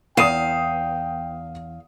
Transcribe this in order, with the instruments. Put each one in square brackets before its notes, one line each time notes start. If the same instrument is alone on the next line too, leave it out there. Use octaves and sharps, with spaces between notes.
[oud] E2 [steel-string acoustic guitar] F5 [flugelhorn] G5 [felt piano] D#6 D#7 E7